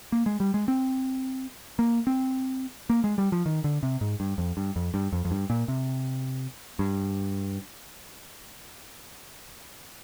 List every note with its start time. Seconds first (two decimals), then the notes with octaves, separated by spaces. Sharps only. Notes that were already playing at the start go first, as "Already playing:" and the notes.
0.12 A#3
0.26 G#3
0.40 G3
0.54 G#3
0.68 C4
1.79 A#3
2.07 C4
2.90 A#3
3.04 G#3
3.18 G3
3.32 F3
3.46 D#3
3.64 D3
3.83 C3
4.01 G#2
4.20 G2
4.38 F2
4.57 G2
4.76 F2
4.94 G2
5.12 F2
5.25 F2
5.31 G2
5.50 A#2
5.68 C3
6.79 G2